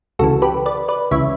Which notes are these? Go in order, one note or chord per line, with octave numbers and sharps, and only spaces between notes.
C#2 C#3 E3 F#4 A4
G4 B4
B4 D5
B4 D5
C#2 C#3 E3 C#5 E5